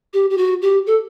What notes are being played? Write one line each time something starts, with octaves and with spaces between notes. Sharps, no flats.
G4
G4
F#4
G4
A4